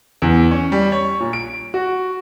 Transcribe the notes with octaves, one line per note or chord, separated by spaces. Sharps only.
E2
C#4
G3
C#5
A#2
D7
F#4